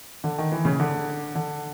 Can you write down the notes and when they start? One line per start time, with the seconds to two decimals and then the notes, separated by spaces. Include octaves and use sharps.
0.24 D3
0.38 D#3
0.52 E3
0.65 C#3
0.80 D3
1.35 D3